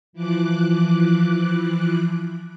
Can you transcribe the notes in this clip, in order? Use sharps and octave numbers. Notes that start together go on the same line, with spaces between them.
E3 F3 D6 F#6